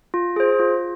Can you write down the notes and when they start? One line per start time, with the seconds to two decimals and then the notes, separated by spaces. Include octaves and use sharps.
0.14 F4
0.36 G#4 C5
0.60 F4